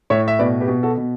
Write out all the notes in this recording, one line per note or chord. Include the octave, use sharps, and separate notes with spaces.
A2 C#5 E5
E5
B2 B4 D5
G4 B4
B2
F#4 A4
B2